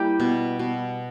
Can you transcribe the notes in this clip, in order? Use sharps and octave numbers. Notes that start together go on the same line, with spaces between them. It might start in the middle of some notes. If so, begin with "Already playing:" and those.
Already playing: G3 A#3 E4 G4
B2
B2